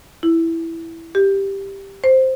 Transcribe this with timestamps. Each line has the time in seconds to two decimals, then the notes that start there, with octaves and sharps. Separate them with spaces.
0.23 E4
1.15 G4
2.04 C5